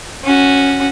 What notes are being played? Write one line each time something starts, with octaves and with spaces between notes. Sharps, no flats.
C#4 F#4